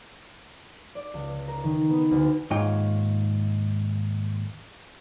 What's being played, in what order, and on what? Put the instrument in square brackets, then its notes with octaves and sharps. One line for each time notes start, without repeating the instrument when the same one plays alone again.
[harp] D5
C#2
A#4
D#3
B3
D2
[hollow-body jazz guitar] D#2 G#2 D#4 F4 C#5 G5